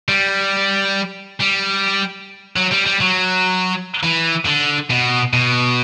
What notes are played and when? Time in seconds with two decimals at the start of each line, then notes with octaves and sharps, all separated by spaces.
0.09 G3
1.40 G3
2.56 F#3
2.71 G3
2.86 G3
3.00 F#3
4.03 E3
4.46 D3
4.90 B2
5.33 B2